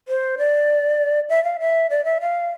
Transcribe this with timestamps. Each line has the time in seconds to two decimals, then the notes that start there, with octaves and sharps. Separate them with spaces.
0.08 C5
0.38 D5
1.29 E5
1.44 F5
1.60 E5
1.90 D5
2.05 E5
2.21 F5